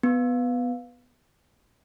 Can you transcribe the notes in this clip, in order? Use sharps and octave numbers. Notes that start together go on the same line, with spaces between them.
B3